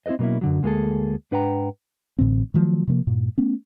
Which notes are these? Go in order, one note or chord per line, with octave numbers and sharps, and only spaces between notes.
C4 E4 A4 B4 D#5
B2 F#3 A#3 C#4 E4
F#2 D3 F#3
D2 G#3 A#3 F4 G#4 A4
G#2 D4 B4 F#5 G5 A#5
A1 A2 D3 C4
D#3 F3 F#3 A3
C3 F3 G#3 A#3
G2 A#2
A3 B3 C#4